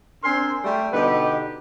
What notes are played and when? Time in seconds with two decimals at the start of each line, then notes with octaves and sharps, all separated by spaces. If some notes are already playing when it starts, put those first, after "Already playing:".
0.23 C4 D4 A#4 G#5 C6
0.64 G3 A3
0.93 B2 D3 B3 D#4 G4 B4